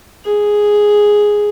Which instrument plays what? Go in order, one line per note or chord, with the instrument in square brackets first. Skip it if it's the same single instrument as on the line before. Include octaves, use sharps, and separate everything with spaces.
[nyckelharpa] G#4